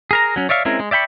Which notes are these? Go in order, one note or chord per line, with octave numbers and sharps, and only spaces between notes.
G#4 A#4 A#5
F#3 C#4
C#5 D5 E5 F5 C#6
G#3 C4 C#4 E4 A#4
G#3
D5 E5 G5 B5 C#6